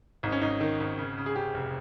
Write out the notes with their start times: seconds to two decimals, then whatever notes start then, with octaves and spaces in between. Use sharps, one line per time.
0.23 G#1 D#4
0.32 C#4
0.42 G#1 D#4
0.61 D#3
0.80 G#1
0.98 C#3
1.18 C#3
1.26 G#4
1.36 C#3 G4
1.54 F1